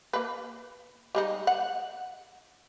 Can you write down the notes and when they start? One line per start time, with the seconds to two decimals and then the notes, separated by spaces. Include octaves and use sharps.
0.13 A#3 B4
1.15 G3 G#3 D#4
1.47 F#5